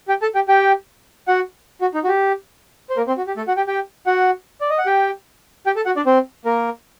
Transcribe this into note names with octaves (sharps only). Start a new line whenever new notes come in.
G4 G5
A4 A5
G4 G5
G4 G5
F#4 F#5
F#4
D#4
F#4
G4
C5
A#3 A#4
C4 C5
F#4
G4
A3 A4
F#4 F#5
G4 G5
G4 G5
F#4 F#5
D5
D#5
F#5
G4 G5
G4 G5
A4 A5
F#4 F#5
D4 D5
C4 C5
A#3 A#4